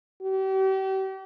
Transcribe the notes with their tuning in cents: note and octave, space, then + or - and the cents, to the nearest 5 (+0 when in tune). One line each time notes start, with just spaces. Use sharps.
G4 -40